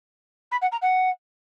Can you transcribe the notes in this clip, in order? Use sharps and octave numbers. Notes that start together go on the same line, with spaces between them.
B5
F#5
A#5
F#5